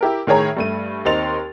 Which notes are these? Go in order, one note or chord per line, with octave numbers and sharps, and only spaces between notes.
E4 G4 A#4
A2 D#3 G#4 C#5 A#5
G2 A3 D#7
D#2 C4 D#4 C6 A6 F7